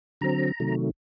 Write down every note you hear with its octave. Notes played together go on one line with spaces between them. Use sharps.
D3 F#3 C4 A#5
C3 D#3 F#3 A3